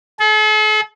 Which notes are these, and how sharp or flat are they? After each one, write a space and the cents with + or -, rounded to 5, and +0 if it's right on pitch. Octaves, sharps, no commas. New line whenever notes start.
A4 -45